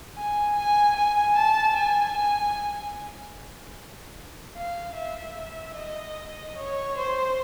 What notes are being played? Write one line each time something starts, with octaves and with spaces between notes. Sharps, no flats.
G#5
G#5
G#5
A5
G#5
G#5
F5
E5
D#5
C#5
C5